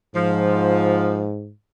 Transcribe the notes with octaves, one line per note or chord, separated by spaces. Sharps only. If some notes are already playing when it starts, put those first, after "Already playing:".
G#2 F3